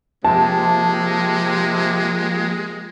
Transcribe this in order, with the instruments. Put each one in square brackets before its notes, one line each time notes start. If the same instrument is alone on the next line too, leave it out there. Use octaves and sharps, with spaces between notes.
[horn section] C3 [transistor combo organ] F3 A#3 G4 [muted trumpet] G#3 [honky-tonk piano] A5